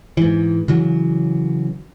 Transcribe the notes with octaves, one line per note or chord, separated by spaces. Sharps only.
G#2 E3
C#3 E3 F#3